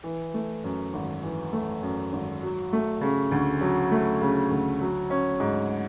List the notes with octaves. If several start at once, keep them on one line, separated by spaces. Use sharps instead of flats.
E3
A3
F#2
G#1
E3
A3
F#2
G#1
F#3
A3
C#3
D2
F#3
A3
C#3
D2
F#3
C#4
G#2